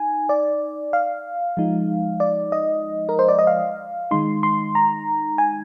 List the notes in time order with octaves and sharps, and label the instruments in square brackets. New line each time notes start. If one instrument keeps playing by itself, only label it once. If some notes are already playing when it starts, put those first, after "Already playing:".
Already playing: [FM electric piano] D#4 G#5
D5
F5
F3 G#3 D#4
D5
D#5
A#4
C5
D5
D#5
F5
D#3 G#3 D#4 C6
C6
A#5
G#5